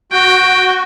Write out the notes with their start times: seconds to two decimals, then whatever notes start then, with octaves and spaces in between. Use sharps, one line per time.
0.12 F#4 G5